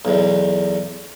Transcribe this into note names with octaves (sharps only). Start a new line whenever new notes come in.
B1 E2